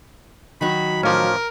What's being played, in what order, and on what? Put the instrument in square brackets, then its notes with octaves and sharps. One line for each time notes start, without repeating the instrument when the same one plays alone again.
[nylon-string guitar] D#3 F#3 [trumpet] B5
[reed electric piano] A2 F5 D6 [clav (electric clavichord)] F3 C#4 [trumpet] A#4